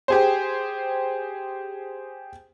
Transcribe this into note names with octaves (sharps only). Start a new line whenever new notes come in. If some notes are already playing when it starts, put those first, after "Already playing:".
G4 G#4 C5